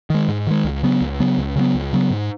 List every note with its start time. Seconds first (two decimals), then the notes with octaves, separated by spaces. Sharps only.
0.10 D#3 G#3
0.28 G#2
0.47 D#3 G#3
0.64 C#2
0.83 C#3 F#3 B3
1.01 C#2
1.20 C#3 F#3 B3
1.38 C#2
1.56 C#3 F#3 B3
1.74 C#2
1.93 C#3 F#3 B3
2.11 G#2